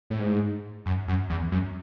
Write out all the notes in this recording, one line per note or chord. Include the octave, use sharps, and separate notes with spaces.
A2
G#2
F#2
F#2
E2
F#2